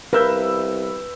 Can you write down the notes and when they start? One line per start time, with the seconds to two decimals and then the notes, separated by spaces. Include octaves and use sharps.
0.13 C2 A#4 B4 E5 F5 B5 E6 G6